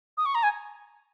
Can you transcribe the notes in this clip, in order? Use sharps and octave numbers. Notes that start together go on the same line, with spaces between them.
D#6
C#6
A#5
G#5